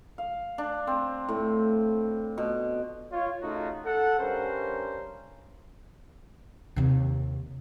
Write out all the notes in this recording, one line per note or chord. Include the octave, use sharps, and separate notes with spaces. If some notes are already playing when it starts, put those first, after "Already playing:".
F5
D4
C4
A2
B2
F4 C#5
C#3 A3 D#4 F4 F#4
A4 F#5
G2 C#4 A#4 C5
D#2 C3